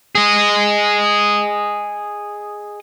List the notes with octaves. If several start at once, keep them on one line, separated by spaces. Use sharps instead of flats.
G#4 D#5